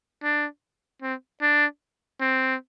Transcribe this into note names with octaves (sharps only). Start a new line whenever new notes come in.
D4
C4
D4
C4